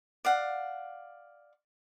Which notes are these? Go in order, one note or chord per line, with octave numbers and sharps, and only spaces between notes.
D5 F5 F#5